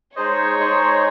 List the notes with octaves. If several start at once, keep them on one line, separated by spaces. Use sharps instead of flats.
G#3 D#4 G#4 C5 C#5 D#5
G#3 D#4 G#4 C5 D#5